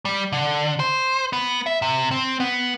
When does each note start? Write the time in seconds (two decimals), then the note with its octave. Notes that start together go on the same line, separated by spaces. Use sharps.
0.05 G3
0.33 D3
0.80 C5
1.33 B3
1.66 E5
1.82 C3
2.11 C4
2.40 B3